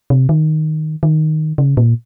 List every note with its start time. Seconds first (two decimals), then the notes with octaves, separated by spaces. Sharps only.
0.10 C3
0.29 D#3
1.03 D#3
1.58 C#3
1.77 A#2